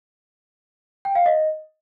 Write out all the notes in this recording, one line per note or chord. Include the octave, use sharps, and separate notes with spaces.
G5
F5
D#5